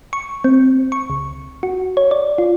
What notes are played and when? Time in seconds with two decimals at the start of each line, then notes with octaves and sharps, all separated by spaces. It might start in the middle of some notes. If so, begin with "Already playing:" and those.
0.13 C#6
0.44 C4
0.92 C#6
1.10 C#2
1.63 F#4
1.97 C#5
2.11 D5
2.38 F4